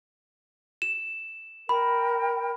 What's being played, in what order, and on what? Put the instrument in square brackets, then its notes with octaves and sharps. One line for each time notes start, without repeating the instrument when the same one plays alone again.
[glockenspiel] E7
[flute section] A#4 G5 [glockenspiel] B5